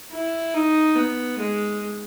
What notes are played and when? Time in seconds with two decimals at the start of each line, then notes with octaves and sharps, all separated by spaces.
0.11 E4
0.53 D#4
0.95 B3
1.39 G#3